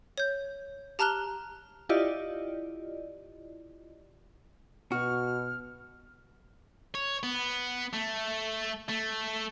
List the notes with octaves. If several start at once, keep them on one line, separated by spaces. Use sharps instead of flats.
C#5 G6
G4 A5 A#5 F6 F#6 G7
E4 F4 G4 D5 D#5
B2 F#4 F6
C#5
B3
A3
A3